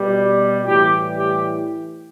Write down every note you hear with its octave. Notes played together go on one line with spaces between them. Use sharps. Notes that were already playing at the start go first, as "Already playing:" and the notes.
Already playing: B2 G3
A2 E3 G3 G4
G4